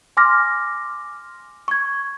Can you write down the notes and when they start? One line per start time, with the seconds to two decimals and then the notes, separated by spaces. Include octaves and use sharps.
0.17 G#5 C6 D6 F6 A#6
1.68 C#6 G#6